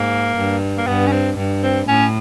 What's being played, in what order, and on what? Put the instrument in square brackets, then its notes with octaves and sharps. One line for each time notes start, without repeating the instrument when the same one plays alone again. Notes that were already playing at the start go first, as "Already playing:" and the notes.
Already playing: [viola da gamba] G#2 [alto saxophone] A#3
[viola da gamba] G2
[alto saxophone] A#3
[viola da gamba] G2 [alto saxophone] B3
[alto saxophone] C#4
C4
[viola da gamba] G2
[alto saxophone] C4
[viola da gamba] A2 [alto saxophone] C#4